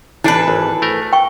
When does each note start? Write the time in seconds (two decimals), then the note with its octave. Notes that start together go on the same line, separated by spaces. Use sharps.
0.24 A1 E3 D4 E4 A4 B4
0.48 G#1
0.82 A3 A#4
1.13 G5 C#6